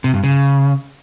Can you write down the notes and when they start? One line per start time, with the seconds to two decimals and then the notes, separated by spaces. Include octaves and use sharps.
0.04 C3
0.14 G2
0.23 C#3